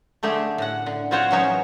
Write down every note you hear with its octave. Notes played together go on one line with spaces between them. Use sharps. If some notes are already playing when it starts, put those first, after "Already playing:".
D3 A3 D#4 G4 G#4
A2 F#5
D3
C4 F4 F#4 C5 C#5 F#5
C#3 E3 F#3 C#4 D#4 C#5